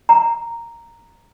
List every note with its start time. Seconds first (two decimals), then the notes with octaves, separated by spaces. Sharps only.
0.09 A#5